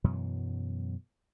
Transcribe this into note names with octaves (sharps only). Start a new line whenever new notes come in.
F#2 B2 E3 F#3